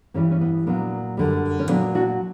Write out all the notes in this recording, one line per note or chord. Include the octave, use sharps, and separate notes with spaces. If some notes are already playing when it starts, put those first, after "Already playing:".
G2 E3 G3 A#3 C#4
C#4
B3
A#2 F#3 B3 D4
F#2 D3 G3
C#4
A#2 F#3 B3 D4
D4 F#4